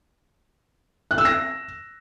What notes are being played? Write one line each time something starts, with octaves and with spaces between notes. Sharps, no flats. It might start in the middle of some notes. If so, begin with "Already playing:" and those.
F#6
E6
A#6